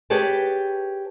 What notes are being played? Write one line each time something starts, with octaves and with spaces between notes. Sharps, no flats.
G4 G#4 B4 C#5 G5 A5